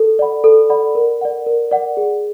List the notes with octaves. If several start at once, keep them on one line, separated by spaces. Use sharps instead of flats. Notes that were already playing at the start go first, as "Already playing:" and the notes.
Already playing: A4
D5 F#5 B5
A4
D5 F#5 B5
A#4
D5 F#5
A#4
D5 F#5
G#4